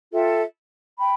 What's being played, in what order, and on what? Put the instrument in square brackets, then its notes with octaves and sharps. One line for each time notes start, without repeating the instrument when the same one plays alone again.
[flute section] F4 A4 E5 G5
G5 B5